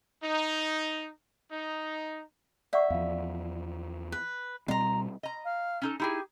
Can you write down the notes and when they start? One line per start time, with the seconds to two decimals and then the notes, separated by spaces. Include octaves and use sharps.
0.22 D#4
1.51 D#4
2.73 D5 E5 F#5 C#6
2.90 E2 F3 F5
4.12 B4
4.68 B2 G3 C4 F4 D#5 A#5 C6
5.23 D#5 A#5
5.45 F5
5.82 C#4 D#4 A4
6.00 D#4 E4 G4 G#4